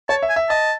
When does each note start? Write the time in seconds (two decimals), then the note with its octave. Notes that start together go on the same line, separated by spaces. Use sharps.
0.09 C#5 A5
0.23 E5
0.29 G#5
0.36 E5
0.49 D#5 A5